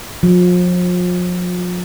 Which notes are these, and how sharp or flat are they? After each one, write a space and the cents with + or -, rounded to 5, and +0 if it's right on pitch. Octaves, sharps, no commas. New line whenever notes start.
F3 +40